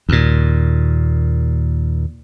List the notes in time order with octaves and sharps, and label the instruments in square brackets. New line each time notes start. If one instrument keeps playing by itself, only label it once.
[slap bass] D#2 A#2